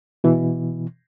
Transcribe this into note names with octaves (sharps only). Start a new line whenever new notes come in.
B2 E3